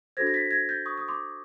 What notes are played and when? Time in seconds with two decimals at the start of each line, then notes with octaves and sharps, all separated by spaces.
0.17 D4 F#4 A4 C5 G#6 A#6
0.27 A#6
0.34 A6 B6
0.51 G#6 A#6
0.69 G6 A6
0.86 C#6 D#6
0.97 D#6
1.08 C6 D6